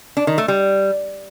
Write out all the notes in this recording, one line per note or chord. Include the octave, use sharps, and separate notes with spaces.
D4
D#3
A3
G3